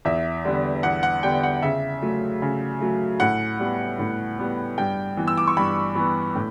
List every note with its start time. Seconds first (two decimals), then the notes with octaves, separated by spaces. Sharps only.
0.05 E2 E5
0.45 D3 G3 B3
0.83 E2 F#5
1.03 F#5
1.23 D3 G3 B3 G5
1.43 F#5
1.62 C#3 E5
2.02 F#3 A3
2.42 C#3
2.81 F#3 A3
3.20 A2 F#5
3.60 G3 B3
3.99 A2
4.39 G3 B3
4.78 G2 G5
5.17 E3 B3
5.28 E6
5.38 D6
5.48 C#6
5.57 G2 B5
5.95 E3 B3
6.35 A2